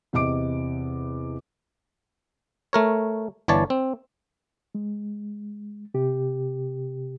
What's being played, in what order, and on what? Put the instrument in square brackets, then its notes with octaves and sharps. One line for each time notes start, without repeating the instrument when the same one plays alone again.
[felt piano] E2 C3 D#5 D6 D7
[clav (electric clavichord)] A3 A#4 C#5
G1 E3 C#5 D5 A5
C4
[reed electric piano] G#3
C3 G4